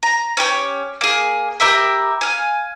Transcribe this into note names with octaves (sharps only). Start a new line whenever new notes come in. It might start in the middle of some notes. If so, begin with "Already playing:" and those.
A#5
C#4 G4 B4 C#5
A#3 G#4
G4 A#4 E5 B5
F5 G#5